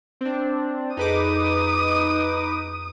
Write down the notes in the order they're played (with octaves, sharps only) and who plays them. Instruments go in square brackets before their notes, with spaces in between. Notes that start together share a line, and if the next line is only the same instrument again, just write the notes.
[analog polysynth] C4 D4
[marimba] F2 G#4 A4 [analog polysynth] D#4 B4 D6 [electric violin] D#6